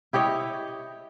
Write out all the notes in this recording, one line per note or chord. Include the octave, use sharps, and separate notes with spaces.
E4 G4 C#5 D#5